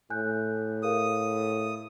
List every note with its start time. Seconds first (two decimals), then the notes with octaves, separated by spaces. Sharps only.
0.10 A2 G#5 F#6 G6
0.83 G#4 A#4 F5 D#6